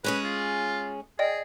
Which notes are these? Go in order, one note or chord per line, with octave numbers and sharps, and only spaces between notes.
G#3 C#4 G#4 B4
F4
G#4 D5 D#5 G5